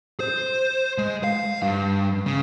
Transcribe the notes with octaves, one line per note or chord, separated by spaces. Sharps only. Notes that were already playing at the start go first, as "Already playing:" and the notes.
C5
G#3
F5
G2
C#3